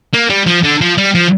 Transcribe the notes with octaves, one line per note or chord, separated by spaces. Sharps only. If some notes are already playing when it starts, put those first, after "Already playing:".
A#3
G3
F3
D3
F3
G3
F3